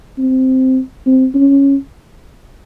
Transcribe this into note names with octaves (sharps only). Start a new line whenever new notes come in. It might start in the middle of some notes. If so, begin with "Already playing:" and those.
C4
C4
C#4